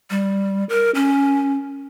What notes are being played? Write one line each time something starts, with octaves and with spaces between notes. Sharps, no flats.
G3
A#4
C#4